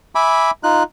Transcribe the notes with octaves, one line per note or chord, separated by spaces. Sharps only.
E5 G#5 B5 D6
D#4 F4 F#6